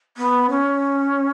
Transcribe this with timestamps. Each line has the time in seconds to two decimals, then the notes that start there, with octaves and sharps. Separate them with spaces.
0.17 B3
0.50 C#4